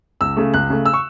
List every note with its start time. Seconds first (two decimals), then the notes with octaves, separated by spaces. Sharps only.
0.21 C#2 E6
0.37 C#3 A3
0.54 C#2 F#6
0.70 C#3 A3
0.86 E6
0.93 C#6